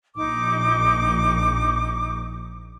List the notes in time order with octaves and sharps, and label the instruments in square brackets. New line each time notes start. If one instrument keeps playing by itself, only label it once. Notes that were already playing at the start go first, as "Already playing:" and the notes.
[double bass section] A#1 [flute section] D#4 D6